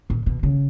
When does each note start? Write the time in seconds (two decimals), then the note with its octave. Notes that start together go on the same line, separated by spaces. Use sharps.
0.10 A#2
0.26 B2
0.43 C#3